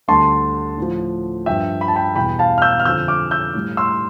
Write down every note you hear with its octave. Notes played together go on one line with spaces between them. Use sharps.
D2 D3 G3 A5 C6
A2 F3
G2 F3 E5 G5
B5
A5
G5 B5
E2 B2 G3 G5 B5
F5 A5
F6
E6 G6
F6
F2 D3 F3 E6 G6
D6 F6
E6 G6
A2 G3
C6 E6